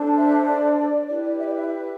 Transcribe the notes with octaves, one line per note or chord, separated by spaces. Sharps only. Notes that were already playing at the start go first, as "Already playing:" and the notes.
Already playing: D4 A4 C5
E5
D5
E4 G4 B4 D5
D5
E5
D5
E5